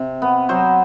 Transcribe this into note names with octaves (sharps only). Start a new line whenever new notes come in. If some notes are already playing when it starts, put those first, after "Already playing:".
Already playing: C3
B3
F#3 C5